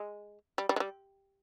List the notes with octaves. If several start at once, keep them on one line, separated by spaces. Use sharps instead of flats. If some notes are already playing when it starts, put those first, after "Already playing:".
Already playing: G#3
G3
G3
G#3
G3